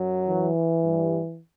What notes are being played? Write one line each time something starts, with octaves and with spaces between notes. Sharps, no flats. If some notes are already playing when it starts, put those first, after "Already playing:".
Already playing: F#2 F#3
E3
G2 G3